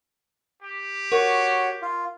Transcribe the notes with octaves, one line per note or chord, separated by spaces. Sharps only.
G4
F#4 A#4 C#5
F4